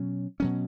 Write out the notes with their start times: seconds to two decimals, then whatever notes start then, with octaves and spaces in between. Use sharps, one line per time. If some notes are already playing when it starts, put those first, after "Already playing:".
Already playing: B2 F#3 C#4
0.40 B2 F#3 C#4